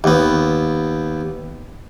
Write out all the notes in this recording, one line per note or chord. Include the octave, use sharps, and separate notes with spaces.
D#2 B3